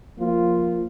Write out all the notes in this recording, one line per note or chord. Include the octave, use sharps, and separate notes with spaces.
F3 A#3 F4